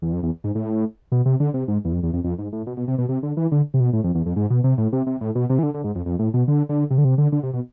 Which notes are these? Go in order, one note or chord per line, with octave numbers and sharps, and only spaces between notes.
E2
F2
E2
G#2
A2
B2
C3
D3
C3
G#2
E2
F2
E2
F2
F2
G#2
A2
B2
B2
C3
B2
C3
D3
E3
D3
C3
B2
A2
F2
E2
F2
G#2
B2
C3
A2
C3
C3
A2
B2
C3
E3
D3
D3
G#2
F2
F2
A2
B2
D3
D3
C3
D3
C3
D3
D3
C3
B2